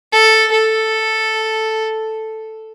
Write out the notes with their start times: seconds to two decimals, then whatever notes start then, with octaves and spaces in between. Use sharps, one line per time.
0.12 A4
0.51 A4